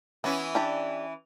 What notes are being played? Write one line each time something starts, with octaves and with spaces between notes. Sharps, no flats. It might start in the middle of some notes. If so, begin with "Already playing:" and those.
E3 B3 C#4 E4
D4 G4 D5